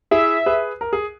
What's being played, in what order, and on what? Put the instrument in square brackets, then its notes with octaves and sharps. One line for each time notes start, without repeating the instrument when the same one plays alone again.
[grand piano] E4 G#4 [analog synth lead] E5
[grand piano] G#4 B4
A#4
G#4